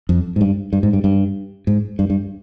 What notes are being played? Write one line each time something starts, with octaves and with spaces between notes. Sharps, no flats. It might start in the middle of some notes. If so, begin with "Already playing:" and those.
F2
G#2
G2
G2
G#2
G2
G2
G#2
G2
G2